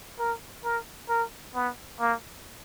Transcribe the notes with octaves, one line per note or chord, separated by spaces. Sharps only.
A#4
A#4
A#4
B3
A#3